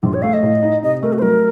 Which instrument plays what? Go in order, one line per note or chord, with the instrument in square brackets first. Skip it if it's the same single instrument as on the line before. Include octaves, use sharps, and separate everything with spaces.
[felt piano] A#1 [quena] F4
[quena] C#5
[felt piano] A3 [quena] F5
[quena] D#5
[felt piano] A2
D#4
[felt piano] C3 [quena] D#5
[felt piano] A3 [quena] A#4
[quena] F#4
C5
[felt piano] F#3 [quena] A#4